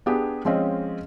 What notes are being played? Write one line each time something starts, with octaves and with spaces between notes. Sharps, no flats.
B3 D4 G4 G#4
F3 G#3 C4 C#4 D#5